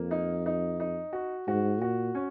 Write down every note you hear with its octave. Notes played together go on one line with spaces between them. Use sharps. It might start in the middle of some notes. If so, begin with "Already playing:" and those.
Already playing: F2 A#3
D#4
D#4
D#4
F#4
G#2 F#4
A#2 F#4
C#4